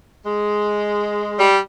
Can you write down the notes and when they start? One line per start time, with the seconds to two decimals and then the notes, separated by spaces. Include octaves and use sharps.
0.24 G#3
1.39 G3